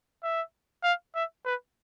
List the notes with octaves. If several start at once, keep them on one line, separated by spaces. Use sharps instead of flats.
E5
F5
E5
B4